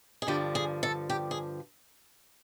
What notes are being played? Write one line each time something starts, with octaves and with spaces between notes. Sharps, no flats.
G#4
G2 D3 F3 G4
G#4
A4
G4
G#4